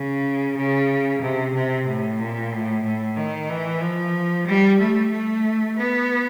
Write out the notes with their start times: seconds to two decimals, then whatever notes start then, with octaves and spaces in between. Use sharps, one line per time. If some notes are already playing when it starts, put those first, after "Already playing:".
Already playing: C#3
0.57 C#3
1.22 C3
1.54 C3
1.87 A2
2.20 A#2
2.52 A2
2.84 A2
3.16 D#3
3.49 E3
3.82 F3
4.47 G3
4.79 A3
5.11 A3
5.77 B3